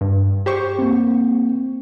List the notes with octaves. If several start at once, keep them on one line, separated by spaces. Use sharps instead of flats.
G2
G4 C5 C#6
A#3 C4